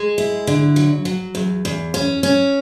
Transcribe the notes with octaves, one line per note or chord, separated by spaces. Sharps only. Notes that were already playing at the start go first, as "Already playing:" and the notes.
Already playing: G#3
E4
D3
F#3
F#3
E2
E2
C#4
C#4